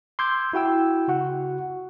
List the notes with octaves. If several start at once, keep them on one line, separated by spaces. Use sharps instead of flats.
C6 D6 E6 G6 G#6
E4 F#4 G5 E6
C#3 F#4 F#5